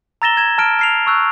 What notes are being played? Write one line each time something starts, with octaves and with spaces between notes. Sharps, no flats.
A#5 E6 A6 A#6 E7 G7
G#6 E7
A5 F6 D7
F6 C7 F7
C#6 E6 F#6